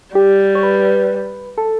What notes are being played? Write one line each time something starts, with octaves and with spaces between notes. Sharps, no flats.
G3 G4
C#5
B4
A4